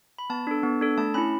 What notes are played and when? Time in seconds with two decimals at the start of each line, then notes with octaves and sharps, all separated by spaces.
0.18 B5
0.30 B3 A5
0.47 D4 A4
0.63 B3
0.81 D4 A4
0.97 A3 A5
1.14 C#4 E4 B5